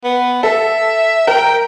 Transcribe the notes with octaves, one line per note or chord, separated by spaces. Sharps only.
B3
A4 E5
A#4 G5